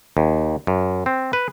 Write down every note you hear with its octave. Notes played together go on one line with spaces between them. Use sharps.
D#2
F#2
C4
B4